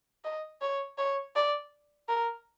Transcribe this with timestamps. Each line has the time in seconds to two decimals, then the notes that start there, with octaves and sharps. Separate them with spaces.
0.24 D#5
0.61 C#5
0.98 C#5
1.35 D5
2.09 A#4